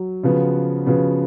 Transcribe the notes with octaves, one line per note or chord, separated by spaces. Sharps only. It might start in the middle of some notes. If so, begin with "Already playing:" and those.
Already playing: F#3
C#3 F3 B3 F#4
C#3 F3 B3 F#4